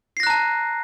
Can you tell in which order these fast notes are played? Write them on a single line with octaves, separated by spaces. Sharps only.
C7 A#6 F#6 A#5 A5